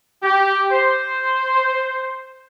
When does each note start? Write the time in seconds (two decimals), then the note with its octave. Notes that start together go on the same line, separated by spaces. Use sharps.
0.23 G4
0.70 C5